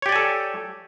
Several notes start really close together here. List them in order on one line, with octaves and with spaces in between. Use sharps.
C#5 G4 D5 G#5 A4